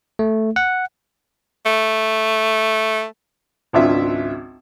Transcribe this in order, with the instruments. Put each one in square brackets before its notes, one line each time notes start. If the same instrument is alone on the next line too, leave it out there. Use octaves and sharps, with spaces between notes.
[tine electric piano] A3
F#5
[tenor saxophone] A3
[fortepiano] G#1 C#2 D4 F4 E5